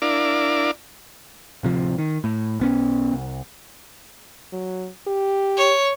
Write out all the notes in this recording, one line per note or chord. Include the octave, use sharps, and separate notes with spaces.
D4 E4 A#4 D5 F5 D6
D1 C3 F3
D#3
A2
B1 B3 C#4
C2
F#3
G4
C#5